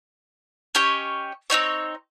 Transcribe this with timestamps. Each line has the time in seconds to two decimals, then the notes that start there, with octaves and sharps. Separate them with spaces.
0.75 C#4 G4 C#5 D#5
1.50 C4 C#4 D#4 C#5